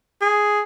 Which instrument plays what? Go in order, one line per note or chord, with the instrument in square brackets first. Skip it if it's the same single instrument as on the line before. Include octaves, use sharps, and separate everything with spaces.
[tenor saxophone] G#4